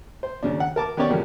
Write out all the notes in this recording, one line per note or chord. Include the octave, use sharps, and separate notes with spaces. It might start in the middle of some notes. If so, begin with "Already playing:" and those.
C5
D#2 C#3 D4
F#5
A#4 A5 D6
D#3 B3 C#4 G4 C#5 D5
E2 A#2 C#3 F3 G3 A#3